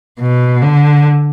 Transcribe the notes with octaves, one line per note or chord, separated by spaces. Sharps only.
B2
D3